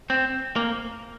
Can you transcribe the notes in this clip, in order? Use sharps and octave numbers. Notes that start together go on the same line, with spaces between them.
C4
A#3